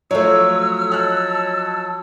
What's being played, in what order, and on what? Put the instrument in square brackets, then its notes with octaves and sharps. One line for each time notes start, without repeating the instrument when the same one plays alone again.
[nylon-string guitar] F3 F#3 [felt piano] A3 C#5 [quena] E6
[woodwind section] C#5 D#5 A5 [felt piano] F6 F#6